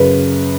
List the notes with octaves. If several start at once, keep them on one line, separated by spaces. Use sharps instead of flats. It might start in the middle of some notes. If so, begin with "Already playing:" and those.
Already playing: F#2 C#3 B4